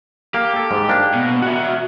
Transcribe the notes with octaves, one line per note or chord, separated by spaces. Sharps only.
A#3 G4
A4
G#2
A#3 D4
B2
F#4 E5 F#5